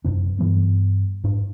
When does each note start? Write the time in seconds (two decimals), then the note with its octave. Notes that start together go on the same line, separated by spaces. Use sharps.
0.05 F#2 C3 D4
0.39 G2 E3 G3 B3
1.24 G#2 D4